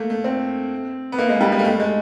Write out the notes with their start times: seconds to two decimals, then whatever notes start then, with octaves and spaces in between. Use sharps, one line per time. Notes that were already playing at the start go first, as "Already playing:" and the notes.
Already playing: A3 A#3
0.10 A3
0.24 C4
1.12 B3
1.19 A#3
1.30 G#3
1.41 G3
1.52 G#3
1.59 A#3
1.65 A3
1.80 G#3